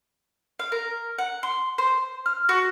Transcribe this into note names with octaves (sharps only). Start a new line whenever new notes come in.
F5
A#4
F#5
C6
C5
F6
F#4